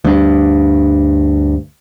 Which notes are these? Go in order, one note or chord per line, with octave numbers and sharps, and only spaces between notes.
D2 G2